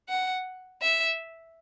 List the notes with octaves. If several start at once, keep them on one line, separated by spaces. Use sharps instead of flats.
F#5
E5